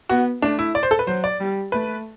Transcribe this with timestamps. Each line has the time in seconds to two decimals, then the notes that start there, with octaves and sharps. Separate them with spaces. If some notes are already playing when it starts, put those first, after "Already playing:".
0.09 B3 F#4
0.42 A3 D4
0.59 E4
0.75 D5
0.83 C5
0.91 A4
0.99 B4
1.07 F#3 C5
1.24 D5
1.40 G3
1.72 A3 B4